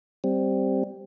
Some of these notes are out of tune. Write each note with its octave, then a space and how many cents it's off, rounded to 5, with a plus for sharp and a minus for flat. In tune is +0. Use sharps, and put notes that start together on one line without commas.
G3 +0 C4 +0